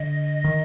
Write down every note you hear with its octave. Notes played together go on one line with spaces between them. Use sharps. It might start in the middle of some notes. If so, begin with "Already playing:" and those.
Already playing: D3 D#5
D#3